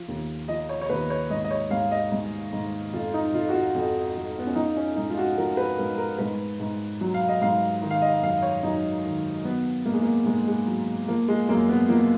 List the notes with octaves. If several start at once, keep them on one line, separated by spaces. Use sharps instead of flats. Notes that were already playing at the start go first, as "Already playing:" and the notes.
Already playing: F3
D#2
F3 D#5
C#5
C#5
D#2 B4
C#5
G#2 D#5
D#5
C#5
G#2 F5
D#5
G#2
G#2
F2 F4
D#4
F2 F4
F#4
F4
F2
F2
B3
C#4
F3 D#4
C#4
G#2 D#4
F4
F#4
F3 A#4
B4
G#2 A#4
A#4
G#2 B4
G#2
F#3
F5
D#5
G#2 F5
D#3
F5
D#5
F#2 F5
C#5
F#2 D#4
D#3
F#3 B3
G#2 A#3
G#3
A#3
G#2 G#3
G#3
F#3
F3 A#3
G#3
F#2 A#3
B3
F3 A#3